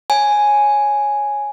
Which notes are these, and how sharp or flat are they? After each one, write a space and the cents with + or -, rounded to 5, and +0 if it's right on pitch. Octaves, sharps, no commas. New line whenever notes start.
C#5 +0 G#5 +0